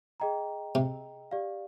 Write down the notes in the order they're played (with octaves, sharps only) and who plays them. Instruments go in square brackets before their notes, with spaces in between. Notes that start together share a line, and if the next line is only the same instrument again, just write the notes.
[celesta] G#4 D#5 G5 A#5
[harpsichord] C3
[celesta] G4 D5 F5